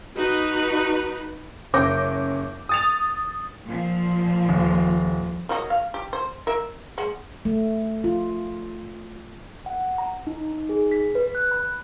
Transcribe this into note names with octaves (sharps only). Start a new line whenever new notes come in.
D#4 F#4 B4
F#1 C#4 D6 G6 A#6
D#6 A6 F7
A#2 F3
D#1
D#3 F#3 D#4
F5
G4
C5
A#4 E5
G#3 F#5
A3
F4
F#5
A#5
D#4
D#4
G#4
B6
B4
F#6
B5